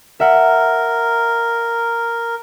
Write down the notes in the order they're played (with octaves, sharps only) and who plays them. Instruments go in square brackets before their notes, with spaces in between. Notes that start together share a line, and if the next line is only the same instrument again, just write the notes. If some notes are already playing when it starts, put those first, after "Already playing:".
[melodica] A#4 [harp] E5 F#5